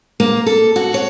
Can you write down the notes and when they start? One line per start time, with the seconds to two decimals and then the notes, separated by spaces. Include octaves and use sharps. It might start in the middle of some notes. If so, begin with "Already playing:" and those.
0.20 A#3
0.46 A4
0.76 F#4
0.94 C#5